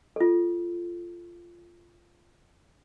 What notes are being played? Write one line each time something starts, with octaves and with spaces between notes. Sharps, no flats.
F4 A4